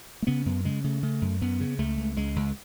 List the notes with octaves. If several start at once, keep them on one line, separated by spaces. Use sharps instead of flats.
A3
C#3 B3
F#2 B3
C#3 G#3
C#3 A3
C#3 A3
F#2
F#2 B3
C#3
C#2 A3
C#2
C#2 G#3
C#2